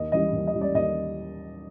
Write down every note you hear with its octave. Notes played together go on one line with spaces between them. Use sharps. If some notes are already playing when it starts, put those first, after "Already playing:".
Already playing: D#2 D#5
C#3 E3 G3 D#5
D#2
D#5
C#3 E3 G3
D5
D#2 D#5